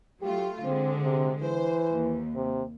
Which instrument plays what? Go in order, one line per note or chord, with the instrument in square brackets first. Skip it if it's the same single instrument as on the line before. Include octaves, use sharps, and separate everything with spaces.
[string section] F#3 A3 F4 [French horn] G4
[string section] D3 G#3 [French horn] C4
[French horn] C3
[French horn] E3 [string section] C5
[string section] D#2
[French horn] C3